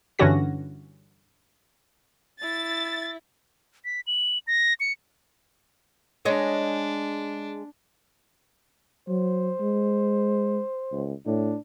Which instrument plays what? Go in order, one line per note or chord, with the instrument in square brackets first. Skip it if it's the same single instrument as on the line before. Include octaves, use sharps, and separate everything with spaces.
[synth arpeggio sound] G2 D3 E3 C#4 F#4 A#6
[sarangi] E4 [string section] A6
[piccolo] B6
F#7
A#6
C#7
[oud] G#3 C#5 D#5 [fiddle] D4
[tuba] F#3 [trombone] C5
[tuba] G#3
C#2
[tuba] A2 [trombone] D4